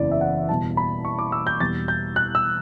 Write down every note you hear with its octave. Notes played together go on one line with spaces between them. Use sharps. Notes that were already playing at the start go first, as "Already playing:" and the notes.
Already playing: F#1 E2 C#3 E3 D5
E5
F#5
E2 B2 G3 A5
B5
C#6
D6
E6
G6
E2 B2 G3 A6
G6
F#6
E6